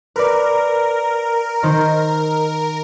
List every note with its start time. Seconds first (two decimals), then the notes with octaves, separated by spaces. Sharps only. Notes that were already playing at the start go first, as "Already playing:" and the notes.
0.16 A#4 B4 D5
1.63 D#3 D#4 C5